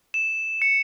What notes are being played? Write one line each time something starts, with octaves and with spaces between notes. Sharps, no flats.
E7
C#7